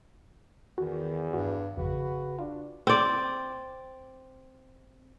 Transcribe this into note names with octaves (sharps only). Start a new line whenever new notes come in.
E2 D#3 F#4
G2 F#4
G#1 F2 C#3 F#4 B4
D4 F4
C4 D5